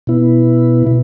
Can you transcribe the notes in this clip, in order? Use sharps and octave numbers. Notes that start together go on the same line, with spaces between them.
B2 B3 E4
B2